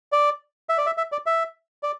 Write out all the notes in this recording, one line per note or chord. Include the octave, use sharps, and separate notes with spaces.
D5
E5
D5
E5
E5
D5
E5
D5